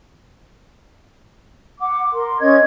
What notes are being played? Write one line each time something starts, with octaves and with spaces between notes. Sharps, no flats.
F#5 D6
A#4 C6
C#4 C#5 D#5 G#6